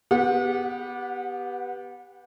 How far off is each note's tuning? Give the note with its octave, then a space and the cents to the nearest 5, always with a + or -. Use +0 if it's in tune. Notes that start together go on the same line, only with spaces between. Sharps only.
B3 -5 G4 +0 F#5 -35